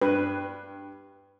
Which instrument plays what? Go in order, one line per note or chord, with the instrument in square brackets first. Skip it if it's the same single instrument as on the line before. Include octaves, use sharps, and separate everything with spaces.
[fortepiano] G2 [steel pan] B4